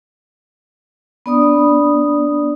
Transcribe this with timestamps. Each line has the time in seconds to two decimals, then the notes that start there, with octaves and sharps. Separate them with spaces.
1.26 B3 D4 D5 B5 D#6